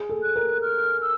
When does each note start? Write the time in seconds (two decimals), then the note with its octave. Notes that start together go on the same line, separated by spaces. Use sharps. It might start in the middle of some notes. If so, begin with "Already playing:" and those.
Already playing: G#4
0.09 A4
0.22 F#6
0.36 A#4
0.62 F6
1.01 E6